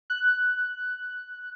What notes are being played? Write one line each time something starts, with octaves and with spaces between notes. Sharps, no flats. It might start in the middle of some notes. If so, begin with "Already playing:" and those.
F#6